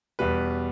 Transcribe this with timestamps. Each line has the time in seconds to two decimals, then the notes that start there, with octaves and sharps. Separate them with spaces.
0.19 E2 B2 G3 B4